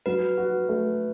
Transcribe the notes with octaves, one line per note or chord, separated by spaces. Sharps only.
F#3 B4
F#4
A3